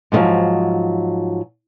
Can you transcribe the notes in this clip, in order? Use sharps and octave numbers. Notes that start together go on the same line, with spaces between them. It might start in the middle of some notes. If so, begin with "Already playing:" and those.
G#2 B2 D3 F3 F#3